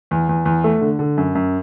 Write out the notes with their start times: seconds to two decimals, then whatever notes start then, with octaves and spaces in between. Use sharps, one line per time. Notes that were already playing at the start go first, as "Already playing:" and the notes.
0.11 E2
0.29 E2
0.45 E2
0.64 A3
0.81 D3
0.99 D3
1.17 F#2
1.35 F#2